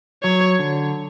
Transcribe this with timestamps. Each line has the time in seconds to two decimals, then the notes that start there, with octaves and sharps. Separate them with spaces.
0.23 F#3 C#5
0.59 D3